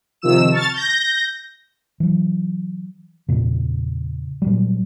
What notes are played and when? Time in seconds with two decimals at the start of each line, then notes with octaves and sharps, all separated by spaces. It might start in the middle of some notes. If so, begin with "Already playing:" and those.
0.22 C3 D#3 F3 E6 E7
0.51 A5 C#6 F6 A6
0.74 G6 A#6
2.00 E3 F#3
3.29 E2 A#2 C#3
4.42 A#2 F#3 G3